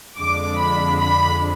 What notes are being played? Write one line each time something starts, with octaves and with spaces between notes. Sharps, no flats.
F2 D3 G#3 D4 D6
B5
B5